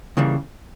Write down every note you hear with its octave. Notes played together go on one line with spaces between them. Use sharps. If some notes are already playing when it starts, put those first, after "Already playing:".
C#2 C#3 E3 G3 A#3